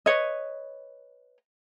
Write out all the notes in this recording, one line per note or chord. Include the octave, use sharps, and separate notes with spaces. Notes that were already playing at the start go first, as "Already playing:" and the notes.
B4 C#5 D#5